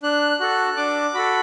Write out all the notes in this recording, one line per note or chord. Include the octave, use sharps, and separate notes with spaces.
D4 F#6
F#4 A4 F#6
D4 D6
F#4 A4 B5